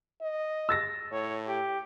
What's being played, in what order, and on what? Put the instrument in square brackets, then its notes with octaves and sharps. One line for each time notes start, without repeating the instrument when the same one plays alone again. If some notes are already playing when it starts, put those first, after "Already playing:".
[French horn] D#5
[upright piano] E6 A6 A#6
[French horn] A2 [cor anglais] C#5
[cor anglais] G4